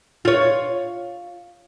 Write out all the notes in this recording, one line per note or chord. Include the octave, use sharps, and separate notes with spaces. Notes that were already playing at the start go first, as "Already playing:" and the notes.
F4 C#5